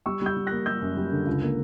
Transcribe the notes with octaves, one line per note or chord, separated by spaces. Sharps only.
G3 C#6 E6
G3 E6 G6
G3
A#3 F#6 A#6
G3 E6 G6
F#2
G3
D3
C#2
A#3